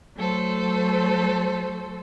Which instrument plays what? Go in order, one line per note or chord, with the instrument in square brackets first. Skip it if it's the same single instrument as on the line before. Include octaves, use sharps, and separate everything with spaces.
[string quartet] F#3 A3 A4 C5